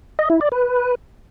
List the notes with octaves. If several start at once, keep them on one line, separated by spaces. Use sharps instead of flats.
D#5
E4
D5
B4